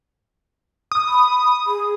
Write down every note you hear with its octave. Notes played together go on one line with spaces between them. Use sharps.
D#6
B5
G#4